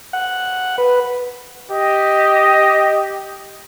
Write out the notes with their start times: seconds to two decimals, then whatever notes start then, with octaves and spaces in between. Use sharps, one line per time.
0.13 F#5
0.78 B4
1.71 G4 D#5